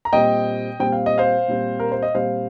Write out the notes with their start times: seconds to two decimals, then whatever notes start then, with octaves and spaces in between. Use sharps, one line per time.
0.05 A#5
0.13 A#2 G3 C4 D#5 G5
0.80 A#2 G3 C4 G5
0.92 F5
1.06 D#5
1.18 C5 F5
1.48 A#2 G3 C4
1.80 A#4
1.92 C5
2.02 D#5
2.14 A#2 G3 C4 C5 F5